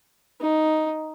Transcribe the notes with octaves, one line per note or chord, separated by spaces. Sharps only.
D#4